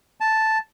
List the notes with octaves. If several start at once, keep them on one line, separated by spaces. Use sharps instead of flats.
A5